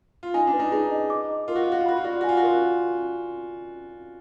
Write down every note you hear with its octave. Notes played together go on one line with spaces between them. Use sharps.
F4
D#4 G#5
D4
B4
D#4
D#4 G#4
D#5
D6
D#5
F4 A#4
F#4
F4 F5
F#4
F4
F#4 B5
F4
F#4 D5
F4
F#4 G#5
F4
F#4
F4 A#4